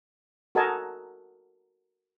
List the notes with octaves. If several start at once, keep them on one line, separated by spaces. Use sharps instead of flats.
F#4 A4 A#4 D#5 G#5 A5